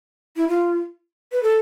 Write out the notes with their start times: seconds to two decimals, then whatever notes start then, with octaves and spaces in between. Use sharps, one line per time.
0.37 E4
0.48 F4
1.32 B4
1.43 A4